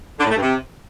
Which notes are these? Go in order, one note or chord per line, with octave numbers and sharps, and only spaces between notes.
D3
A2
A3
G2
C3